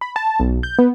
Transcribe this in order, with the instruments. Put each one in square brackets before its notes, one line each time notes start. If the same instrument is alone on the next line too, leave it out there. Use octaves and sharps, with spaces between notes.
[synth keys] B5
A5
B1
G6
B3